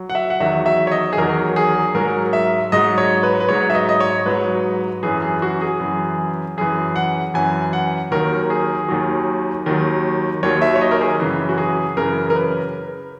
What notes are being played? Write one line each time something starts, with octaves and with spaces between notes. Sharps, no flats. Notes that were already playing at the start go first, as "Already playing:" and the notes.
Already playing: F#3
F#5
E5
F#5
E2 D#3 F#3 E5
E5
C#5
D#5
G#4
E2 D#3 F#3 A#4
G#4
G#2 F#3 A#4
E5
G#2 F#3 D#5
C#5
B4
B4
G#2 F#3 C#5
E5
D#5
D#5
C#5
G#2 F#3 B4
F#2 E3 G#4
G#4
F#4
G#4
F#2 E3
F#2 E3 G#4
F#5
F#2 E3 G#5
F#5
D#2 D#3 F#3 A#4
G#4
D#2 D#3 F#3
D#2 D#3 F#3
D#2 D#3 F#3 C#5
E5
C#5
D#5
A#4
G#4
F#2 C#3 E3
F#4
G#4
F#2 C#3 E3 A#4
A#4
B4